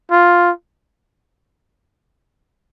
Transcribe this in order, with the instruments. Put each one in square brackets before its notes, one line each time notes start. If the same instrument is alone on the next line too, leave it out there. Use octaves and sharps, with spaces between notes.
[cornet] F4